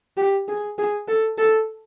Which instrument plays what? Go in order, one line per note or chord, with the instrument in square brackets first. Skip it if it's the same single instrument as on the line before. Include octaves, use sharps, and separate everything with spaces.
[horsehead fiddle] G4
G#4
G#4
A4
A4